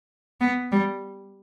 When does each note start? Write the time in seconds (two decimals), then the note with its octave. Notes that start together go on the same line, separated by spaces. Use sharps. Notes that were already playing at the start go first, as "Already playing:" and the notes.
0.41 B3
0.72 G3